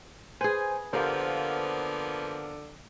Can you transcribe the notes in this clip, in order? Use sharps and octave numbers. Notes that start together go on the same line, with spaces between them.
G#4 B4 C5 G#5
D3 F3 A#3 B3 G4 A#4 C5